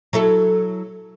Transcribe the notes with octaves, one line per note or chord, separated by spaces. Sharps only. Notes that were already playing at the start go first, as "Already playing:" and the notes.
F#3 E4 A4